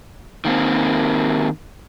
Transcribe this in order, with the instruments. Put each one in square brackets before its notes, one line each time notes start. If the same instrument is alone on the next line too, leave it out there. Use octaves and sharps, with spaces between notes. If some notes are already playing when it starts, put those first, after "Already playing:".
[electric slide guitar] D#3 A#3 C4